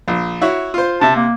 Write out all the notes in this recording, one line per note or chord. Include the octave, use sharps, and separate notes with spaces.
A#1
E4 F#4 C#5
F4 C5
C3 E5 A5
A#3